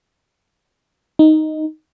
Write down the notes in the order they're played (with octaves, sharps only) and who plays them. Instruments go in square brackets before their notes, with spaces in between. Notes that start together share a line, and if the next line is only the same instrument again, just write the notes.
[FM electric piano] D#4